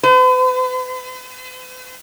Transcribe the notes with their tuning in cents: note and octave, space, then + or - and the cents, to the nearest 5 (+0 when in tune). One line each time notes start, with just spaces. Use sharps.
B4 +45